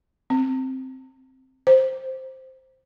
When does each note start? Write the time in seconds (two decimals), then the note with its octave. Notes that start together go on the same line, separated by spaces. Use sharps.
0.30 C4
1.67 C5